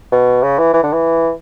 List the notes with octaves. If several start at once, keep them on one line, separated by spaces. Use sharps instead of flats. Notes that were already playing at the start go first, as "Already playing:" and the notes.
B2
C#3
E3
E3
D3
E3